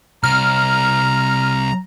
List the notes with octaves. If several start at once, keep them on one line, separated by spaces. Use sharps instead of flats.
C2 A#5 F6